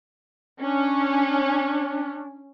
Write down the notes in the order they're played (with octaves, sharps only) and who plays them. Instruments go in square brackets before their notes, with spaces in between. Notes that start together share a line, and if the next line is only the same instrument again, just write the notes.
[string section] C#4 [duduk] D4